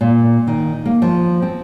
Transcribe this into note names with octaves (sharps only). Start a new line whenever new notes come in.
A#2
D#3
A#3
F3
C4